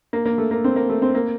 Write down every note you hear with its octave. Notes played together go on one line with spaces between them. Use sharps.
A#3
A#3
A3
A#3
C4
A#3
A3
C4
A#3